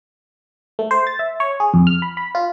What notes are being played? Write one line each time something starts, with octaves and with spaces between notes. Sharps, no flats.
A3
C5
A6
E5
C#5
G#4
F2
F6
B5
B5
F4